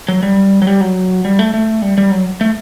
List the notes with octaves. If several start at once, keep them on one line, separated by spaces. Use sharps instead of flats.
F#3
G3
F#3
G3
F#3
G3
A3
A3
G3
G3
F#3
A3